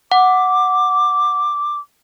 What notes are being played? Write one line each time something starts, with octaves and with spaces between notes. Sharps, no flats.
F#5 D6